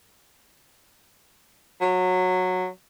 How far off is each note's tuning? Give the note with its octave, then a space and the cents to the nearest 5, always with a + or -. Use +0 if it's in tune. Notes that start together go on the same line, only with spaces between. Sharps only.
F#3 -15